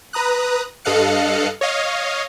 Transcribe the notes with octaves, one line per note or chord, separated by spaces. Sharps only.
B4 A#5 D#6 F#6
G2 A4 D#5 F5 F#6 C#7
C#5 D#5 F5